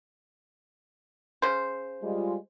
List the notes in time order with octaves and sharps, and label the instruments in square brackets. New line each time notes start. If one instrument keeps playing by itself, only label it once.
[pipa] C#3 C5
[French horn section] G3 G#3 F4